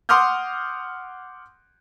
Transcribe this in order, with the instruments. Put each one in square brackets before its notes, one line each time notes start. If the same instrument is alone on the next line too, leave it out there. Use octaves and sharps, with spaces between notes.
[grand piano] F#5 C6 D6 D#6 F6 G6